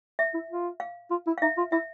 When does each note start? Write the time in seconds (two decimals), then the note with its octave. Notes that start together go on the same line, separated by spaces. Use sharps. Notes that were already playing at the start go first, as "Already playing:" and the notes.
0.19 E5
0.34 E4
0.50 F4
0.80 F5
1.11 F4
1.27 E4
1.38 F5
1.42 D#4 E5
1.57 F4
1.72 E4 E5